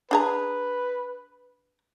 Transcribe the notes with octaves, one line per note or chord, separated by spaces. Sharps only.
D4 G#4 B4 A#5